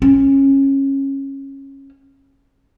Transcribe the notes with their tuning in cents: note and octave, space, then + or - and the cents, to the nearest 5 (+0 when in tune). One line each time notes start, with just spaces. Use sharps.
C#4 -20